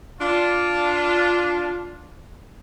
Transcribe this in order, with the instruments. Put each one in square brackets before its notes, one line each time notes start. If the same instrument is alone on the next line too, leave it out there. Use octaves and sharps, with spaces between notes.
[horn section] D4 F4